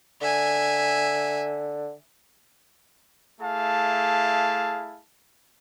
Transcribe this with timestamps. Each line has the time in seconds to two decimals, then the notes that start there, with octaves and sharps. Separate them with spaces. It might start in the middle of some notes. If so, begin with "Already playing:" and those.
0.21 D3 E5 G#5
3.41 A3 E4 G#4 F5 A5